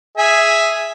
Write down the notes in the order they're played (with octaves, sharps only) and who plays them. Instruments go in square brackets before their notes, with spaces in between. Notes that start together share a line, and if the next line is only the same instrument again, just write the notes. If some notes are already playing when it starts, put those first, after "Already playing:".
[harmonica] G#4 E5 G#5